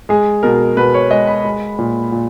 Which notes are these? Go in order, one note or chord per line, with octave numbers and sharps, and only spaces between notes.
G#3 G#4
B2 A#4
B2 B4
C#5
G#3 D#5
B5
G#3
A#2
A#2